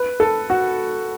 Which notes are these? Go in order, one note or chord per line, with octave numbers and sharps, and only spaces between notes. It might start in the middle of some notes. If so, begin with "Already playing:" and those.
Already playing: B4
A4
F#4